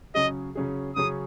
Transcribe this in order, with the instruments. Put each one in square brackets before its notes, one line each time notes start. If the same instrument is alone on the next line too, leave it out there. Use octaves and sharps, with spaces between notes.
[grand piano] C#3 F#3 C#4 G#4 [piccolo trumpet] D#5
[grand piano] C#3 F#3 C#4 G#4
[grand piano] C#3 F#3 C#4 G#4 [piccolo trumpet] D#6